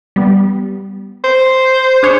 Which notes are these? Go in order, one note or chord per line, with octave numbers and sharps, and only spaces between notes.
G3 B3
C5
D4 G#4 C#5